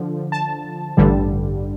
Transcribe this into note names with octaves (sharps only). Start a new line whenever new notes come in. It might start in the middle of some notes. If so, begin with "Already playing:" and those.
Already playing: D3 F3
A5
A1 G2 D3 G3